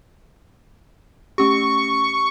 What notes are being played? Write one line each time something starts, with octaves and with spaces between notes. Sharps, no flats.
A3 C#4 G4 C#6